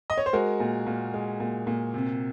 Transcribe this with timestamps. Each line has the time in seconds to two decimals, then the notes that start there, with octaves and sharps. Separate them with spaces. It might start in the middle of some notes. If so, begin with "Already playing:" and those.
0.10 D#5
0.18 C#5
0.26 C5
0.33 G#3 F#4 A#4
0.60 A#2
0.87 A#2
1.14 G#3
1.40 A#2
1.67 A#2
1.94 C3